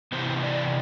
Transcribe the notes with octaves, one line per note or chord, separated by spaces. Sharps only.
C3 E3 B3 C5
D5